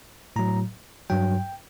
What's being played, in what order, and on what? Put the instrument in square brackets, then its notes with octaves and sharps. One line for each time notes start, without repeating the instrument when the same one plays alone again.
[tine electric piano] A2 F#3 A#5
G2 F#3 G5